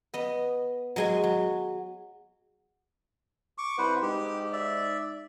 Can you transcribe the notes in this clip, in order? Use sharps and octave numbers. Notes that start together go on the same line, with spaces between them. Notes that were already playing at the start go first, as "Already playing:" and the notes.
B3 D#5
F#3 G#3 G#5
F#3
C#6 D6
C2 B4 C5 F#5
G#2 G4
D5 E5